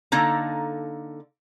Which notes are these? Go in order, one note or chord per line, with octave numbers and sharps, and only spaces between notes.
D3 A#3 D#4 A4 A#5